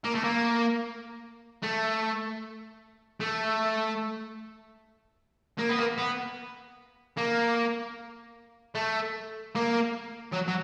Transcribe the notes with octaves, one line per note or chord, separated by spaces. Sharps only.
A#3
A3
A#3
A3
A3
A#3
B3
A#3
B3
A#3
A3
A#3
F#3
F#3